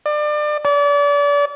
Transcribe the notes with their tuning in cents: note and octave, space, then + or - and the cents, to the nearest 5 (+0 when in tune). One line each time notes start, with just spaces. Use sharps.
D5 +30
D5 -35